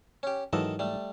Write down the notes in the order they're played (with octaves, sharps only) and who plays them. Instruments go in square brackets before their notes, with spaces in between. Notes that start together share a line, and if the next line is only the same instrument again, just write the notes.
[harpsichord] C#4 G4
[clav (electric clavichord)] G#2 E3 F#3 [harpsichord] D#3 A4 D#5
[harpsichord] G3 A3